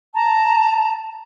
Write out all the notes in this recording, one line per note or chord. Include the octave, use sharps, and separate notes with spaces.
A5 A#5